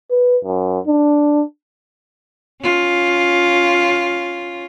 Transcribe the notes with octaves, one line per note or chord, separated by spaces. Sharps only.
B4
F#2
D4
C#4 F4